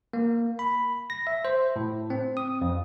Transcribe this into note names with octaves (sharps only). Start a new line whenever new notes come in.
A#3
B5
A#6
E5
C5
A2
C4
D#6
F2